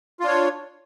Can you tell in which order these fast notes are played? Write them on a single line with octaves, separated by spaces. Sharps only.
F4 D4 C#5